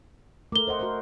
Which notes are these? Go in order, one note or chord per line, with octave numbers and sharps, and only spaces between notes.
A3 A#4 D6 G7
C5 D#5 F#5
F#4 A#4 C5